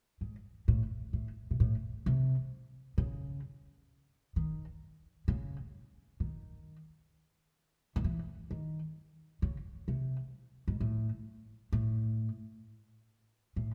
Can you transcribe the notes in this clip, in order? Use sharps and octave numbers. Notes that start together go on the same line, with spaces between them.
G#2
A2
A2
C3
A2
C3
C#3
D#3
C#3
D#3
D#3
E3
D#3
C#3
C3
G#2
A2
A2
A2